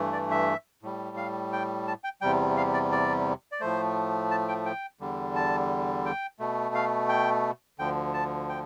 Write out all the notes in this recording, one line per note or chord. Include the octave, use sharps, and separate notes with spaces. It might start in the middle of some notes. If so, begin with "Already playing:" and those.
Already playing: G2 E3 A3
D5
E5
A2 G3
F5
G5
A5
G5
E2 C3 G3 G5
F5
D5
D5
D5
A2 F3 A3 C5
A5
G5
G5
E2 D3 G3
A5
G5
B2 A3
F5
G5
D2 D3 F3 G5
A5
G5